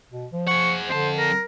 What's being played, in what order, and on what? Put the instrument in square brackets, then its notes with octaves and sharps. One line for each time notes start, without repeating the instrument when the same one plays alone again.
[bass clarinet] B2
F3
[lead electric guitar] G#4 F#5 [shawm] C#6
[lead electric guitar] F2 A5 [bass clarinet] D3 [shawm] C5
[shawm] A#4